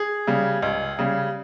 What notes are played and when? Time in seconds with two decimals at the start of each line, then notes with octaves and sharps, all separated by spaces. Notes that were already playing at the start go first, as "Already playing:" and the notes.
Already playing: G#4
0.27 C#3 G3
0.62 C#2
0.99 C#3 G3